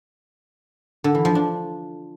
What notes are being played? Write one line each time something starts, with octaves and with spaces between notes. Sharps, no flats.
D3
E3
F3
D4